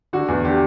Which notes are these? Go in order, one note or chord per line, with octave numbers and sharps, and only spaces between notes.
D3 F#4
E2
D3 G4